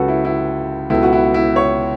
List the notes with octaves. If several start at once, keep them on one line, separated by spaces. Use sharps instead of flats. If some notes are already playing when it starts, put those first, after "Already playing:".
Already playing: C#2 C#3 F#3 F#4 A4 B4
E4
E4
C#2 B2 F#3 B3 E4 A4
F#4
E4
E4
C#5